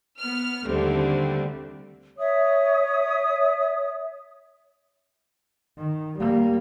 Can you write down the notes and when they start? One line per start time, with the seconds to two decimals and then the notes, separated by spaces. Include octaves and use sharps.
0.19 B3 F6
0.65 D#2 D3 G3 A3 C4
2.19 C#5 E5 D#6
5.78 D#3
6.19 G3 A#3